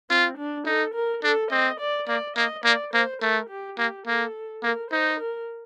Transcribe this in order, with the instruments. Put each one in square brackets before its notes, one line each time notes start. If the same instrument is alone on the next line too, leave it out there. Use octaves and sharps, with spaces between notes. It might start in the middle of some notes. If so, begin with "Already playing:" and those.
[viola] C4 [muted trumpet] F4
[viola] D4
[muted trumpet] D#4 [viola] A4
[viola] A#4
[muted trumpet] D4 [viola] A4
[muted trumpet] C4 [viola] D#5
[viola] D5
[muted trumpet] A#3 [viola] D5
[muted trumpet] A#3 [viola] D#5
[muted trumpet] A#3 [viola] D5
[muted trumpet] A#3 [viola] C5
[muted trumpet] A3 [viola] A#4
[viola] G4
[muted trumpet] A#3 [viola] G4
[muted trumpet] A#3 [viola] A4
[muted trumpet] A#3 [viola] A#4
[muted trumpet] D#4 [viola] C5
[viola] A#4